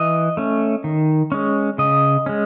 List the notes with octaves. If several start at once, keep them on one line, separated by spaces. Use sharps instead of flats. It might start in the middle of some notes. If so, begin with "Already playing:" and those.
Already playing: E3 D#5
A3 C#4
D#3
G#3 C#4
C#3 D#5
G#3 C#4